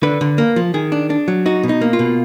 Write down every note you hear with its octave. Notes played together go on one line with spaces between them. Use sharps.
D3 B4
D3
A#3
F3
D#3 G#4
D4
D4
F#3
D#4 F#4
B2
D#4
A#3
F4
B2